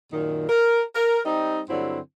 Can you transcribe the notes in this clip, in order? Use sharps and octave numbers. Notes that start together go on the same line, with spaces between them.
F#2 A#2 D#3
A#4
A#4
G3 C4 D#4
G2 D3 F#3 C4 E4